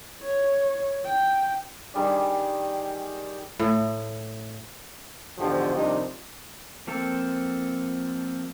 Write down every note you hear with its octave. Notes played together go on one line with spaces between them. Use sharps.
C#5
G5
D#3 G3 G#4 D5
A2
E2 G#2 D3 F3 F#4 G4
C3 D#3 F3 G3 D4 D#4
F3 A#3 C4 A4